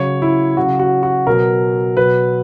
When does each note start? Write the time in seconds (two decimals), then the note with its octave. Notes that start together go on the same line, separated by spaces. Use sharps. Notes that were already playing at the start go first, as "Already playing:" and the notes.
Already playing: C#3 F#3 C#5
0.22 E4
0.57 C#3 F#3 F#4
0.79 F#4
1.03 F#4
1.27 B2 F#3 A#4
1.97 B2 F#3 B4